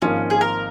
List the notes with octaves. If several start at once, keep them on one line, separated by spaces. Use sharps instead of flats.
G#1 G#2 F3 A#3 C#4 F4
G#4
A#4